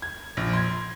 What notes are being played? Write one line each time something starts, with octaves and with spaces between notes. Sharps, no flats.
G#6
A#1
C6 G#6